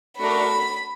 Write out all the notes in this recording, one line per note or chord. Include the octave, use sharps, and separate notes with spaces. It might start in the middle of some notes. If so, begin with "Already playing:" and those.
A3 D4 F#4 A#4 D5 B5